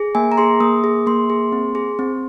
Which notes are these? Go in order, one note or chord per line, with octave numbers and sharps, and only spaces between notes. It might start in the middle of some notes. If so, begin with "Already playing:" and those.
Already playing: G#4
A#3 G#5
A#5
G#4 C6
A#3 D#6
G#4
A#3 C6
G#4
C4
G#4
C4